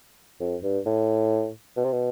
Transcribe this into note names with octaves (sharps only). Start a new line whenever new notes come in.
F2
G2
A2
B2
C3
B2